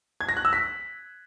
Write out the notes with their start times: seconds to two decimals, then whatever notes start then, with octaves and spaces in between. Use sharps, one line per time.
0.21 G#6
0.29 A#6
0.37 F#6
0.45 E6
0.53 B6